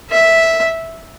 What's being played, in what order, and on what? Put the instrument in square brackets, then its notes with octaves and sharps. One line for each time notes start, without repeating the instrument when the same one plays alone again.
[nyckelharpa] E5